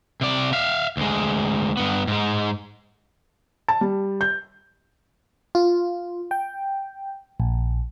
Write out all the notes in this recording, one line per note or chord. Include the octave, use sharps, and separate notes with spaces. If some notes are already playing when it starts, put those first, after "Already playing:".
C3 D5
E5 F5
D2 G#3
G2 B3
G#2 G#3
A5
G3
G6
F4
G5
A#1